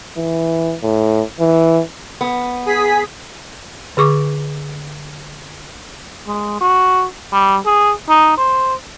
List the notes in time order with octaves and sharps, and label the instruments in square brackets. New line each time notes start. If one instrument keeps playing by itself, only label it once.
[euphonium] E3
A2
E3
[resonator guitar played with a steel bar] B3
[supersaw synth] G#4 B6
[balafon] D3 G#4 C#6 D6
[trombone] G#3
F#4
G3
G#4
D#4
C5